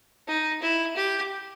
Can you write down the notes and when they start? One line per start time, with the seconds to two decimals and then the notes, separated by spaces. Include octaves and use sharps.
0.28 D#4
0.62 E4
0.96 G4